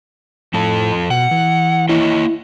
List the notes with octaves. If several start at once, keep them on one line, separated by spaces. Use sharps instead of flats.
F2 A2 F3 A4
B2 F#5
E3
A#3 E4 C#5 D#5